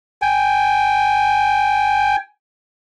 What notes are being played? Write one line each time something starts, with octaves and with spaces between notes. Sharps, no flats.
G5 G#5